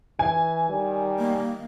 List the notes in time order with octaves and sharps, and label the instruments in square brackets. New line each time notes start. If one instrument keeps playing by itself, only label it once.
[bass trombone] E3 [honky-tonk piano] G#5
[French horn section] D#3 [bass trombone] G3
[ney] A#3